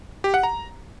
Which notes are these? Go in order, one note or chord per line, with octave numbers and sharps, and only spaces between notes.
G4
F#5
A#5